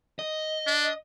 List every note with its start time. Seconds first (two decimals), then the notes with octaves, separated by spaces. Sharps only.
0.19 D#5
0.67 D4